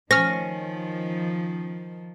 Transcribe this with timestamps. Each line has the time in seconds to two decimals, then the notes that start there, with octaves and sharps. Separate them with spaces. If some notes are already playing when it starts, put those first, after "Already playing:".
0.11 D#3 F3 C#4 F6 A#6